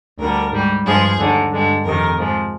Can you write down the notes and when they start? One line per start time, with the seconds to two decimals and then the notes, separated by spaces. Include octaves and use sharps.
0.19 D2 D3 G3 A#4
0.52 G#2 G3
0.85 G2 F3 G#3 G#4
1.19 D#2 D3 G#3
1.51 G2 D3 G#3
1.84 F2 C3 D#3 A#4
2.17 G#2 F3 G#3